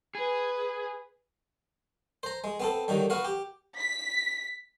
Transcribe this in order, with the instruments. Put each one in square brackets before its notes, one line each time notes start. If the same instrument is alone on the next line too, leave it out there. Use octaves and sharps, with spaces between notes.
[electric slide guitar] G#4 [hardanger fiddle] B4
[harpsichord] C5 A#5
G#3
B3 C4 A4
D3 D#3 F#3 G3
B3 F#4 F5 F#5
G4
[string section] B6